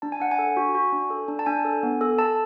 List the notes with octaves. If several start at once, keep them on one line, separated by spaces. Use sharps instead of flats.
D4 A5
G#5
D4 F#5
G#5
A4
F#4
F#4
D4
A4
D4
A5
D4 G#5
A4
B3
A4
A4 A5